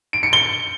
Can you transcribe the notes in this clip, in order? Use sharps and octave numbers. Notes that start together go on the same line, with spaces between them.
D7
C#7
G7